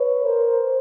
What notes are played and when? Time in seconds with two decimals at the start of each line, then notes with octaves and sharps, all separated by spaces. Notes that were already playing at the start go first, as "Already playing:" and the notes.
Already playing: B4 C#5
0.25 A#4 C5